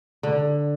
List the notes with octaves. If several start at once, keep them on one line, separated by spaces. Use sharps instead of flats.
D3